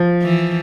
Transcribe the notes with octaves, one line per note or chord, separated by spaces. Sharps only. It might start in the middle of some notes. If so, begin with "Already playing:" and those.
Already playing: F3
E3